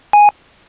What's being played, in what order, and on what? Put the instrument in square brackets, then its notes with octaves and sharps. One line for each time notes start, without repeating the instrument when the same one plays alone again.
[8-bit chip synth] G#5